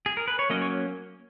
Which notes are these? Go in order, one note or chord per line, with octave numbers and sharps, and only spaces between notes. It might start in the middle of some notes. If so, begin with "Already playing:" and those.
G#4
A#4
B4
C#5
F#3 A#3 C#4 D#5
C#5